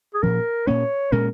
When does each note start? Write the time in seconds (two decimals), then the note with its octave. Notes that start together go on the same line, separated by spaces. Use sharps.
0.14 G#4
0.22 A#2 F3 C#4 A#4
0.67 A#2 A#3 C#4 C#5
1.12 A#2 G#3 C#4 A#4